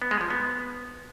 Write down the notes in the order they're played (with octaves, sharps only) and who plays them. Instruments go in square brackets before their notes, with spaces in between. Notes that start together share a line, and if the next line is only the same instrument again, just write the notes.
[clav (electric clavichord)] B3
G#3
F3
B3